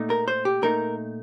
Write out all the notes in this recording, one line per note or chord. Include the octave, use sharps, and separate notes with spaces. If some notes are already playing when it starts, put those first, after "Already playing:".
Already playing: A#2 A3 D#4
A#4
C5
G4
A#2 A3 D#4 A#4